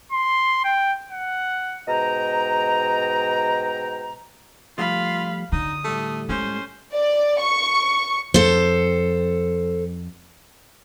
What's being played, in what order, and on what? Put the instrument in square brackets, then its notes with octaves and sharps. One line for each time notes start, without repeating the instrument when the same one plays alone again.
[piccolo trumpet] C6
G5
F#5
[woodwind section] G#2 B2 D#5 G5 A#5
[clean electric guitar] F3 G3 A3 [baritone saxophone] F4 [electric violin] F5 B5
[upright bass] D3 [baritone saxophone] D#4 [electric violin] D#6
[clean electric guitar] A2 G3 A4 [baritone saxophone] A3
[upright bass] G#3 [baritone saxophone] C#4 [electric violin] C5
[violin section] D5
C#6
[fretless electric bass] F2 [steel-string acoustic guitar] A4 C5